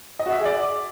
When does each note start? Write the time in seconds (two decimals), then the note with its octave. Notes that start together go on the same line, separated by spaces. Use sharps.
0.19 D#5
0.26 F#4
0.32 E5
0.39 G#4
0.45 D5